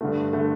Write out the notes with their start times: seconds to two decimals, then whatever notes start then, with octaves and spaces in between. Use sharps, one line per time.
0.01 G2 D3 A3
0.33 D3 A3